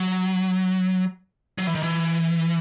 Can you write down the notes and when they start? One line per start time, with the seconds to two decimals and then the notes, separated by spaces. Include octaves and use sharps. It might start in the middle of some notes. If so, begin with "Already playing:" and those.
Already playing: F#3
1.58 F#3
1.67 E3
1.75 D#3
1.83 E3